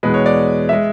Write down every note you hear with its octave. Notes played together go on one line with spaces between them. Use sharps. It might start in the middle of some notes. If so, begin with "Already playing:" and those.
E2 B2 G#3 B4
C#5
D5
G#3 E5